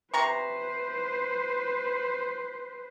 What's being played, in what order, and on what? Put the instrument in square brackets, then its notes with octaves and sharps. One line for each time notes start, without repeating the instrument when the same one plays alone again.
[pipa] C3 A#5 C#6 [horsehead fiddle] B4 C5